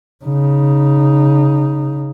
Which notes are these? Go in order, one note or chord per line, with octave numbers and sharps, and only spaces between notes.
C#3 D#4